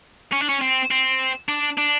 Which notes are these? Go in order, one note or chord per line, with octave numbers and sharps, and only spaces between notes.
C#4
D4
C#4
C4
C4
D4
D4